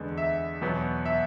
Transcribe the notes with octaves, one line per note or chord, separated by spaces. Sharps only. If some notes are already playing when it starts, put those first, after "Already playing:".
Already playing: E2 D3 G#3 B3
E5
E2 B2 F#3 B3
E5